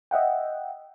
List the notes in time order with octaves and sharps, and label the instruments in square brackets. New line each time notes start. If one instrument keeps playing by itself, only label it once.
[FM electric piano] D#5 E5 F#5 G5